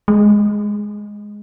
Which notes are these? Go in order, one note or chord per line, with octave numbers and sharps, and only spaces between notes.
G#3